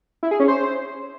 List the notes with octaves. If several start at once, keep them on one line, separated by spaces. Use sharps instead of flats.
E4
G#4
C#4
C5